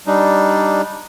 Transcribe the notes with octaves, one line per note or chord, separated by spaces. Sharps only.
G3 D4 D#4